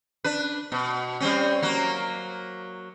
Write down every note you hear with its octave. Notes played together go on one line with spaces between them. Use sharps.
D4 B4
B2
G3 C4 C#4
F#3 A#3